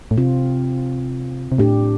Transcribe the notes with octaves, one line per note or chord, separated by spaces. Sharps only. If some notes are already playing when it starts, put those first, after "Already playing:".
A2
C3 C4 F4
C3
A2 D4 G4